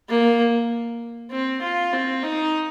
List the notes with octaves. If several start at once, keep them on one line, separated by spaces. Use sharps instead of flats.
A#3
C4
F4
C4
D#4